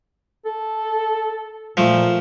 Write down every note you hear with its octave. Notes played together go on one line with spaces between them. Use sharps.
A4
A#2 F3 A3